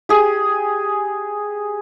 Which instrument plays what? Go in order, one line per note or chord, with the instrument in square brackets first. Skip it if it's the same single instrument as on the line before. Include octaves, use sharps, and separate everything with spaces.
[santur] G4 G#4